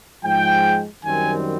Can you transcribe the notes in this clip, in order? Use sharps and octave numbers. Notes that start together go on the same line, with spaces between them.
G#2 F3 G#3 G5
F#2 D#3 G3 C4 G#5